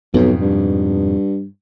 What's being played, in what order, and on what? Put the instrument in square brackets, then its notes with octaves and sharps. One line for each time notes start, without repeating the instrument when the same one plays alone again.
[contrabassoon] B1 [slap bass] F2 G#2 B2
[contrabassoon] G2